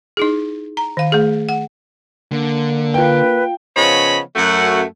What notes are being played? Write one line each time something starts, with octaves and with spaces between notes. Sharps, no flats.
D#4 E4 G#4
A#5
D#3 F5
A3 G#4
F#5
D3 A#3
F4 B4 G5
C#3 F3 B3 C#5 D#5 B5
F#2 A3 F#5